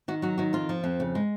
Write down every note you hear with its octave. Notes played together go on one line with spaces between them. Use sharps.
D#3 F#4
F#3 F#4
D#3 F#4
F2 F4
F3
F2
C#3
G#3